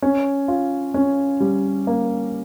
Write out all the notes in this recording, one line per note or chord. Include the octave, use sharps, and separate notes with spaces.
C#4
F4
C#4
G3
A#3